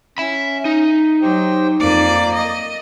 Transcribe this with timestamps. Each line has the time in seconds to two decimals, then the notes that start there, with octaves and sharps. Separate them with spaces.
0.18 C#4 E5 B5
0.65 D#4
1.22 F#3 G4 C5 G5
1.80 F2 A#3 D5
2.35 D#5